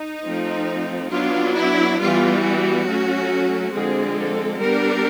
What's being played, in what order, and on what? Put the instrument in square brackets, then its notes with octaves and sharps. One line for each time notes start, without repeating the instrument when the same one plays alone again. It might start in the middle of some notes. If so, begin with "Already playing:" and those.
Already playing: [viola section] D#4
F3 A3 C4
F#3 B3 D4 F4
E4
E3 G3 B3 F4
F#4
F#3 A3 C#4
D3 F3 G#3 C4 G#4
A4
G3 B3 D4 A#4